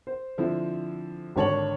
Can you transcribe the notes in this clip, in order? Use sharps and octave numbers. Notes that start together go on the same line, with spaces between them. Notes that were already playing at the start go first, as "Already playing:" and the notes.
C5
D3 F3 C4 E4
G#1 D3 C#5 A5 C#6 F#7